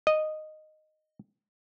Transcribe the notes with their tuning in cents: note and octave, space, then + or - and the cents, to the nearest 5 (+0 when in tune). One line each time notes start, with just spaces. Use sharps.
D#5 -10